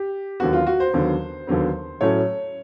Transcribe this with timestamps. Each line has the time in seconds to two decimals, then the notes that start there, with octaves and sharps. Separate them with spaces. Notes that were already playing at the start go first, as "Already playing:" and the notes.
Already playing: G4
0.40 D#2 D3 F#3 B3 F#4
0.53 F4
0.67 F#4
0.80 C5
0.93 D#2 D3 F#3 B3
1.47 D#2 D3 F#3 B3
2.01 A2 F#3 A3 C#4 C#5